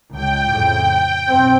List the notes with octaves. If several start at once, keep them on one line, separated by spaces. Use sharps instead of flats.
C#2 G5
F2 A2 C#3
B1 F#2 C4